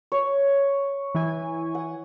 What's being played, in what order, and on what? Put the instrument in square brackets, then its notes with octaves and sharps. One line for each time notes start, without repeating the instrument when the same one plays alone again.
[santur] C#5
[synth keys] E3 E4 G#5
[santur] F#5